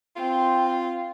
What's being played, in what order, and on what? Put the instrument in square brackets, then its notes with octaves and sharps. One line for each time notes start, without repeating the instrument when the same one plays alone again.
[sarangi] C4 [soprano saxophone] F4